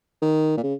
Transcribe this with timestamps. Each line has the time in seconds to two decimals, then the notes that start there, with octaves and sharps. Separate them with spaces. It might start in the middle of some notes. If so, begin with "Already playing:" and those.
0.22 D#3
0.57 A#2
0.63 C#3